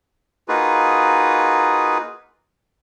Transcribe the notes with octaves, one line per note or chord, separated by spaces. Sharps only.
A#3 D#4 F4 F#4 G#4 B4